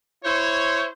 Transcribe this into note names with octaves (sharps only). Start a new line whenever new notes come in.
E4 C5 C#5